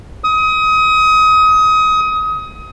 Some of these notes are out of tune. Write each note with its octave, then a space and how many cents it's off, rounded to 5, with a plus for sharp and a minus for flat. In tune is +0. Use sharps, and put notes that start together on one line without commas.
D#6 +25